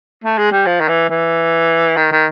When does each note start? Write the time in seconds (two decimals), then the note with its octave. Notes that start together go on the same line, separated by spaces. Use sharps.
0.24 A3
0.38 G#3
0.52 G3
0.66 F3
0.81 D#3
0.88 E3
1.09 E3
1.97 D#3
2.12 D#3